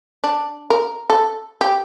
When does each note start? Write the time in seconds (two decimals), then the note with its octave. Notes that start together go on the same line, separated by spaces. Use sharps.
0.24 D4
0.70 A#4
1.10 A4
1.61 G4